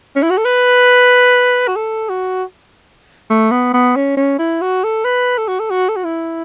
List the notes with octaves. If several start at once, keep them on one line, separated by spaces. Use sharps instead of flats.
C#4
E4
F#4
A4
B4
F#4
A4
F#4
A3
B3
B3
C#4
C#4
E4
F#4
A4
B4
A4
F#4
A4
F#4
A4
F#4
E4